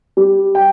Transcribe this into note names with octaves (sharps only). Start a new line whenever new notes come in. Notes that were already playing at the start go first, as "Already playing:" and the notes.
G3
G5